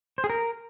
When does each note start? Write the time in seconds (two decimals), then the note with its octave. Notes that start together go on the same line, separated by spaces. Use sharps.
0.18 C5
0.24 G#4
0.30 A#4